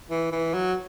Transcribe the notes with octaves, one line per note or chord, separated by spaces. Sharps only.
E3
E3
F#3